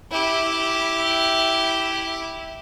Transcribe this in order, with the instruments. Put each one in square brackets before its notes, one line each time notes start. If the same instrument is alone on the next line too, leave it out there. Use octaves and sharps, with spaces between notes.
[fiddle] E4 G4